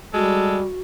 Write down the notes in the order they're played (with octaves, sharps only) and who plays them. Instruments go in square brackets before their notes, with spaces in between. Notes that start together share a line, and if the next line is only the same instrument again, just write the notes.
[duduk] G3 [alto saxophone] G#3 [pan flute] F#4 [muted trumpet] A4